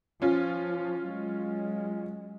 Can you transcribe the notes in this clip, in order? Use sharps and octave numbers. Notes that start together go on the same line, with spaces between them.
F3 C#4 F4
F#3 G#3